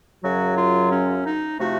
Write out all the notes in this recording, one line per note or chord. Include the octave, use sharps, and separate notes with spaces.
F#2 C#3 F#3 F#4
F4
C#4
D#4
C3 F3 A3 F#4